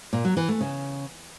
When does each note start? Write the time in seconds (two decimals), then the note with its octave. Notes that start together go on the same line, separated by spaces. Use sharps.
0.13 A#2
0.25 F#3
0.37 E3
0.49 A3
0.61 C#3